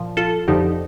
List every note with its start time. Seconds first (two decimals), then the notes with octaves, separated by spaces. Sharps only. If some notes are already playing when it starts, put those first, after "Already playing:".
Already playing: A#2 F3
0.17 F4 A4
0.48 F2 D3 F3 D#4 G4